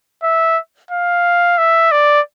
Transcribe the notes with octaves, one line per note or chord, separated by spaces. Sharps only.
E5
F5
E5
D5